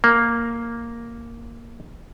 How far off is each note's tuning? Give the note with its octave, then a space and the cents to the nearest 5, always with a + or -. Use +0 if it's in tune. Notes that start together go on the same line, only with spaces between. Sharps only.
A#3 -5